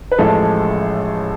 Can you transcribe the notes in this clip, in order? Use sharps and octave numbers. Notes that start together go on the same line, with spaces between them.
B4
A1 A2 F3 G#3 A4